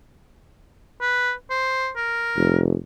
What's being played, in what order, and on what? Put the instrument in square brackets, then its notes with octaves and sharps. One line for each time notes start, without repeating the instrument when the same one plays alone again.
[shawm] B4
C5
A#4
[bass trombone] F1